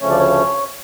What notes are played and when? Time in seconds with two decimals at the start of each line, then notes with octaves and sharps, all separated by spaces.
0.01 D2 C#3 F3 A3 C#4 C#5
0.10 D5
0.19 C#5